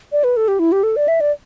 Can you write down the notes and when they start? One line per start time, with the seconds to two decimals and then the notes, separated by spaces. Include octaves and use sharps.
0.12 D5
0.24 B4
0.37 A4
0.48 G4
0.59 E4
0.72 G4
0.83 A4
0.96 D5
1.08 E5
1.21 D5